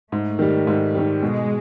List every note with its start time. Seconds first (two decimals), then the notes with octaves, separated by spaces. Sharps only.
0.12 G#2 A3
0.39 D#3 G3
0.67 G#2
0.95 D#3 G3
1.22 B2 G#3